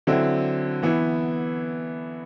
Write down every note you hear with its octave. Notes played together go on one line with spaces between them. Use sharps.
D3 F#3 C4 E4
E3 B3 E4